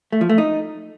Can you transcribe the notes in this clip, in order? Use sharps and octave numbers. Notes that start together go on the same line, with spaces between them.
A3
F3
A3
D#4